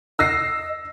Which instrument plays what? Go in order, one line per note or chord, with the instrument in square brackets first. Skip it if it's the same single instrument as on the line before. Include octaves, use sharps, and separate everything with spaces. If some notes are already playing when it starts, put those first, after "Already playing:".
[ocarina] D#5 [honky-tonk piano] E6 A#6 C7